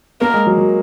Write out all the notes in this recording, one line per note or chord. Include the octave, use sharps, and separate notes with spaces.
A#3 A#4
G#3
F#3
F#3